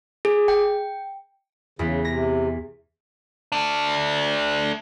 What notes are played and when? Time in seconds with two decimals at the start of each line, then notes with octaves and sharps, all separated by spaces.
0.25 G#4
0.48 G5
1.79 E2 C#3 B3
2.05 C3 A#6
3.52 A3 D4